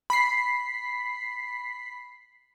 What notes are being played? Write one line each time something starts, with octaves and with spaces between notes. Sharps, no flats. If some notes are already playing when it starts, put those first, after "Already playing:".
B5 B6 C7